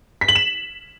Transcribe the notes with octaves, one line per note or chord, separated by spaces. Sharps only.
B6
F#7
E7